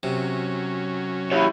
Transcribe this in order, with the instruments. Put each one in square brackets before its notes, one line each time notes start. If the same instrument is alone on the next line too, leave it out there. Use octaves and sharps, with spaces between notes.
[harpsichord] C3 [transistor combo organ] F#3 C#4
[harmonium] E4 [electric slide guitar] G4 C#5